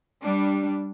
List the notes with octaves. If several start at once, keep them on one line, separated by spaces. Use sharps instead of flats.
G3 D4